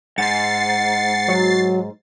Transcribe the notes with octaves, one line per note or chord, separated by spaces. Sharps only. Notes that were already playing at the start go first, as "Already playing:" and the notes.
G#2 F#5 A6 C7
F#3